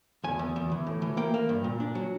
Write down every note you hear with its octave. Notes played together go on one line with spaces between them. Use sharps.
E2 G#5
E2
E2
E3
A2
E3
A#3 G5
A#3
G2
A#2
D4
F#3